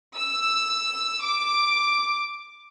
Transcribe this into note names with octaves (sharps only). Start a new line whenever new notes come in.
E6
D6